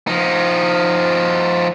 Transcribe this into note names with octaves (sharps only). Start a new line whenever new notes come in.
F3 D#4